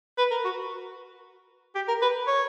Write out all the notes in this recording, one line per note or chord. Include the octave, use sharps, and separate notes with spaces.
B4
A#4
F#4
G4
A#4
B4
C#5